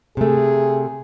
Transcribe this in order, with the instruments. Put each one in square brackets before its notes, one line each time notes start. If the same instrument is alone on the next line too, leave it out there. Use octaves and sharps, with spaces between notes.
[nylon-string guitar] C3 A3 [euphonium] G#4